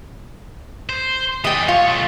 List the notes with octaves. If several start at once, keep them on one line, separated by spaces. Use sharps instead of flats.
C5
E3 D5 D#5 G5
F4 C#5
B1 A3